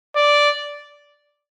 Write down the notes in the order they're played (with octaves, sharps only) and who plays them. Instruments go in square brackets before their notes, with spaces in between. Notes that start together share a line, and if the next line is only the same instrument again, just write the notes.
[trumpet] D5